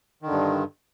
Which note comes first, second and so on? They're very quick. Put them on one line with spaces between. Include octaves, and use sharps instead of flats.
D#3 D3 G2